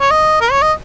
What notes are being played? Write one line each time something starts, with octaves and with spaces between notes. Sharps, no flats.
C#5
D#5
A#4
C#5
D#5